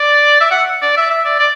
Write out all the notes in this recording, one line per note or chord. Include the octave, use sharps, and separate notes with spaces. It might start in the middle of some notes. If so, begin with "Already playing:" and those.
Already playing: D5
E5
F#5
D5
E5
E5
D5
D5